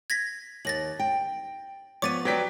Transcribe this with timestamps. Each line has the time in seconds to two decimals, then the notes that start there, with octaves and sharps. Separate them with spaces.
0.10 G#6 A#6 B6
0.65 D#2 A6 A#6 F#7
0.99 G5
2.02 F3 B3 C#5 D6 A6 D#7
2.25 F#3 B4 D5 G5 B6